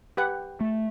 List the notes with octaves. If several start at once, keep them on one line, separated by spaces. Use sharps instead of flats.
G4 B4 F#5
A3